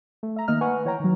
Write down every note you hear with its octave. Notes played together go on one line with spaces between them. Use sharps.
A3
E5 A#5
D#3 A#3 D#5 F6
B4 F#5 G#5 C#6
E3 C#5 G5 A#5
D#3 F#3